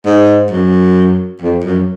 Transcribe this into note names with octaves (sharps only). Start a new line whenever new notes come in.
G#2
F#2
F2
F#2